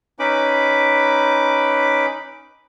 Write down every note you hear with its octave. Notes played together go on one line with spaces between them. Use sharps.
C#4 D#4 B4 B5 D6